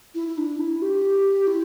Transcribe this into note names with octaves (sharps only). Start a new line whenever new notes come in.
E4
E4
D4
E4
G4
E4